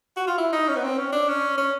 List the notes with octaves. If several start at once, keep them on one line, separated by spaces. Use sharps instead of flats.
F#4
F4
E4
D#4
C#4
B3
C4
C#4
D4
C#4
C#4